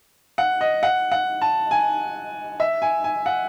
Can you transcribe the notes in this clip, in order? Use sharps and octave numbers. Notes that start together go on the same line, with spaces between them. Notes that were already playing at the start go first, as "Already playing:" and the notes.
F#5
D#5
F#5
F#5
A5
G#5
E5
G#5
G#5
F#5